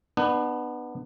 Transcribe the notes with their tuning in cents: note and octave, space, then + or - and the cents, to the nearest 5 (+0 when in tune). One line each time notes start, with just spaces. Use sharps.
B3 +0 D4 +35